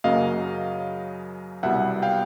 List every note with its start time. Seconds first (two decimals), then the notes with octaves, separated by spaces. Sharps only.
0.04 F#2 C#3 F#3 A#3 D#5 F5
1.63 C2 B2 G3 B3 E5 F#5
2.02 F5 G5